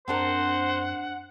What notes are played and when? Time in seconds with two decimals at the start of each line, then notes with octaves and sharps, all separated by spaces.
0.08 F#2 C4 D4 A#4 C5 F#5